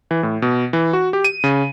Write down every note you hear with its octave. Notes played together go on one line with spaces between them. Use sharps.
E3
A2
B2
E3
F#4
G4
D#7
C#3